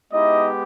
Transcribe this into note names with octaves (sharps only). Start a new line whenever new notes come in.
G#3 B3 D#4 E4 G4 D#5